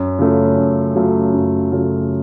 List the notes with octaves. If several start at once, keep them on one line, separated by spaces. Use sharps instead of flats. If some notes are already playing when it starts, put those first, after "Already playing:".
Already playing: F#2
C#3 F#3 A3 F4
F#2
C#3 F#3 A3 F4
F#2
C#3 F#3 A3 F4